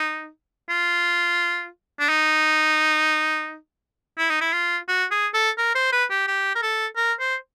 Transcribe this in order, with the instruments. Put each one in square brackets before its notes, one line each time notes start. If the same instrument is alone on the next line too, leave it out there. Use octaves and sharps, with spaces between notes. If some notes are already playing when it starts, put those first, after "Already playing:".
Already playing: [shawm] D#4
F4
D4
D#4
E4
D#4
E4
F4
F#4
G#4
A4
A#4
C5
B4
G4
G4
A#4
A4
A#4
C5